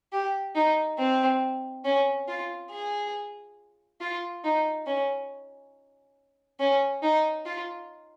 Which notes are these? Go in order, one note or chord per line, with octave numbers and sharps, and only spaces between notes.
G4
D#4
C4
C#4
F4
G#4
F4
D#4
C#4
C#4
D#4
F4